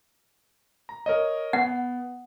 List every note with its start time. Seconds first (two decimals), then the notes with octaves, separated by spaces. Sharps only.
0.89 A#5
1.06 A#4 C#5 D#5
1.53 B3 F#5